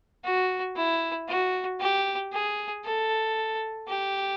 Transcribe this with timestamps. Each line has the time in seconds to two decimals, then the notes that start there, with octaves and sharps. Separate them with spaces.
0.24 F#4
0.76 E4
1.29 F#4
1.80 G4
2.33 G#4
2.84 A4
3.88 G4